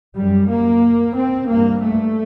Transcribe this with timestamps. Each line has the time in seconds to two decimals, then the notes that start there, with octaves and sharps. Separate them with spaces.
0.17 F#2 G3
0.50 A#3
1.16 C4
1.49 G2 A#3
1.82 A3